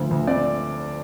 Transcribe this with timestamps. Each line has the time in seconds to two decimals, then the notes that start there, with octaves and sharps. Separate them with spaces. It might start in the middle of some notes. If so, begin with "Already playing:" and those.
Already playing: D2 D3 F3
0.11 D2
0.27 C4 D5